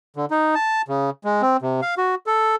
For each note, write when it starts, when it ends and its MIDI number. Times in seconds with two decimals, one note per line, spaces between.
0.16 0.25 50
0.31 0.55 63
0.55 0.82 81
0.88 1.10 49
1.24 1.42 56
1.42 1.57 60
1.62 1.81 48
1.82 1.94 77
1.98 2.15 66
2.27 2.55 69